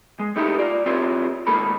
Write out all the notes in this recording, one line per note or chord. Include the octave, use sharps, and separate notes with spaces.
G#3
A3 D#4 E4 G4
F4 D5
C4 E4 F4 G4 C#5
G#2 D#3 A3 A#3 A4 B5